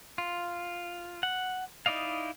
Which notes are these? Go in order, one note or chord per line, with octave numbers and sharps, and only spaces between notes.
F4
F#5
D#4 E4 D5 D#5 F5